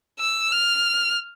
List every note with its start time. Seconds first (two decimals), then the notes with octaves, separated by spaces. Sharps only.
0.19 E6
0.53 F6